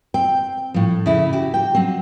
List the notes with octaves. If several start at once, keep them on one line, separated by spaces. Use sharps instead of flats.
C4 G5
A2 F3
C#3 E4
F#4 G4
G5
F#3 C4